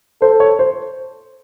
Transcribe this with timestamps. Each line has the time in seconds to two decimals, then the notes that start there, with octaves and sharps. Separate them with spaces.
0.22 A4 C5
0.40 C#5
0.59 C5